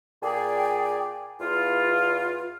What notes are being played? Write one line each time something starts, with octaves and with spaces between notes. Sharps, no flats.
A#2 G#4 D5 G5
E2 F4